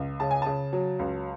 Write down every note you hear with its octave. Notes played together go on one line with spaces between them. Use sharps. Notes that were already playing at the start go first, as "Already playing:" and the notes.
Already playing: C#2
C#3 A5
G#5
C#3 A5
F#3
C#2